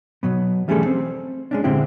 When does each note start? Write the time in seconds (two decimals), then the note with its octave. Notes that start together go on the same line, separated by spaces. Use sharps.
0.23 B2 F#3 B3
0.68 E3 G3 A3 C#4 G#4 A4
0.86 C4
1.51 G#3 C#4 D4
1.64 A#2 D3 G#3 C4 E4 G4